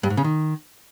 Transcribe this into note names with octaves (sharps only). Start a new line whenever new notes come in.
G2
G#2
C#3
D#3